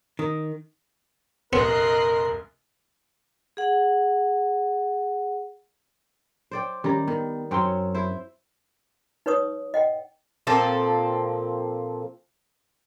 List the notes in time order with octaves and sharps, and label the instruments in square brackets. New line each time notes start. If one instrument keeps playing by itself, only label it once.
[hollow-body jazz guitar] D#3
[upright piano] F1 A#1 C6 [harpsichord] B3 [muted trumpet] A#4 [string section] D#5 F#6 C7
[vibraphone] G#4 F#5
[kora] C5 D5 G5
[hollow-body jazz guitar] D#3 C#4 A#5 [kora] G3
[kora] D#3 [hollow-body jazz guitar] B3
[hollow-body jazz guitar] F#2 G5 C6 [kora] F#3 C4 C#4
[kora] E4 C5
[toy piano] D#4 B4 C#5 C#6 D#6
D#5 F#5 G5
[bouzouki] A#2 F3 C4 A4